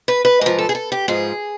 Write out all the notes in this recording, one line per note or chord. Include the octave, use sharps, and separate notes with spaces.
B4
B4
G#2 F3 A#4
A4
G#4
A4
G4
G#2 F3 G#4